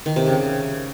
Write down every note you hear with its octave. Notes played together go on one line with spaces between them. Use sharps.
D#3
C3
C#3